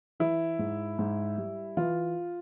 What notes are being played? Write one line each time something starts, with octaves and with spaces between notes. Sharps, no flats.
E3 E4
G#2
G#2
G3
E3 F4